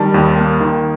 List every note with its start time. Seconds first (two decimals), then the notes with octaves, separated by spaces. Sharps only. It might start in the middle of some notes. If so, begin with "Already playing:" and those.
Already playing: D#3 G3 A5
0.14 D#2
0.37 A#3
0.61 D#3